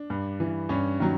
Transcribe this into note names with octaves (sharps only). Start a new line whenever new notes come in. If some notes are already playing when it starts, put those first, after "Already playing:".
Already playing: D4
G2
E3
G2 C#4
D#3 F#3